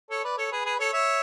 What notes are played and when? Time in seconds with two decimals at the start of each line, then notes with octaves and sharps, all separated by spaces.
0.10 A4 C#5
0.24 B4 D5
0.37 A4 C#5
0.52 G#4 B4
0.65 G#4 B4
0.79 A4 C#5
0.93 C#5 E5